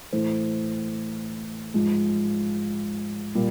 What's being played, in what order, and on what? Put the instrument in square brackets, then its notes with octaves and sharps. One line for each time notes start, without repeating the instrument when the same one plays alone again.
[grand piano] A2 E3 A3 C5
G#2 F3 G#3
A#2 G3